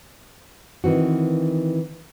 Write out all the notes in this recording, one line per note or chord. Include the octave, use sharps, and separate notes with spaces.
D#3 E3 C4 F#4